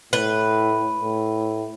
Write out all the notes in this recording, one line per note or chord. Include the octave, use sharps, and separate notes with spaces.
A2 B4
A2